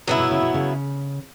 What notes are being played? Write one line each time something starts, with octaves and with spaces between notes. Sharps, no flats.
C#3 F#3 B3 E4
B2
C#3
B2
C#3